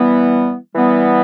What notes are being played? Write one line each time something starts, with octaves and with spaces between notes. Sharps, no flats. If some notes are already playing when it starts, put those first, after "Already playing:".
Already playing: E3 G3 B3
E3 G3 B3